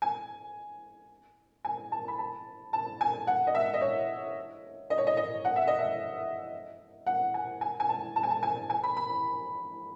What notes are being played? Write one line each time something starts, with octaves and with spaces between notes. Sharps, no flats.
G#5
G#5
A5
B5
A5
A5
G#5
F#5
D#5
E5
D#5
C#5
D#5
C#5
D#5
D#5
F#5
E5
D#5
E5
F#5
G#5
G#5
G#5
A5
A5
G#5
A5
G#5
G#5
B5
B5